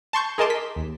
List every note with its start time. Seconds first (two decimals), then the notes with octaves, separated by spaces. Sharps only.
0.13 A5 C6 C#6 G6
0.38 G#4 A#4 D#5 A5 C6 D6
0.50 B6
0.76 D#2